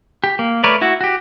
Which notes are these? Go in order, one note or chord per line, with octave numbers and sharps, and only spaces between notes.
G4
A#3
A3 A#4 B4 C#5 D5
E4 F#4
F#4 G4